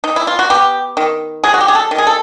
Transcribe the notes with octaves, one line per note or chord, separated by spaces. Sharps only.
D#4
E4
F4
F#4
B3 G4
D#3
F#3 G#4
F#4
G4
G#4
A4
D#3
G#4
A4